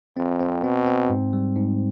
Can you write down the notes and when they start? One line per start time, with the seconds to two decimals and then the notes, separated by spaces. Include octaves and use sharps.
0.17 F2 C4
0.40 C4
0.64 B2 C4
0.87 C4
1.10 G#2
1.33 G3
1.56 G#2